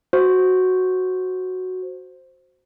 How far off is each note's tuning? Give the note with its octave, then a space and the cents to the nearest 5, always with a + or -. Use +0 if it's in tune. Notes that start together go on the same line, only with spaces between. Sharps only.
F#4 +0 C5 +0